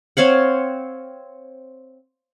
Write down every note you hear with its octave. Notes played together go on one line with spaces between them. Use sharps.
C4 C#5 F5 F#5